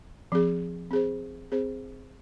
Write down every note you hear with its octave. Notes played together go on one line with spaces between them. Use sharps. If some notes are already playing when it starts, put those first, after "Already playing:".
F3 C4 G#4
C4 G#4 C5
C4 G#4 C5